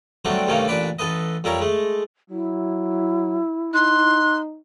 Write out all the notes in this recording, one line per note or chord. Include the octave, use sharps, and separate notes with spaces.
F#3 G3 A3 C4 D4
G2 C3 D#3 A3 A#3 C#4
A1 A#2 D4 B4 B5 D6
A1 A4 B4 D#5
F2 G3 E4 A#4 C#5 A#5
G#3 A3
F#3 E4
D#4 C6 F#6